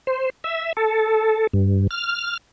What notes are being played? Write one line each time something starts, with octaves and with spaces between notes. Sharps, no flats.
C5
E5
A4
G2
F6